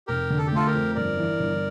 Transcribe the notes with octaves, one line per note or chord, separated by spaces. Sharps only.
F1 G4 A#4
D3
A4
G4
A3 F4 A4
G4 A#4
F2
G1 A#4 D5
E3
G1